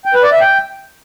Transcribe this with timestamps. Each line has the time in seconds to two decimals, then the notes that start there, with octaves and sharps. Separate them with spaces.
0.05 G5
0.14 B4
0.23 D5
0.32 E5
0.41 G5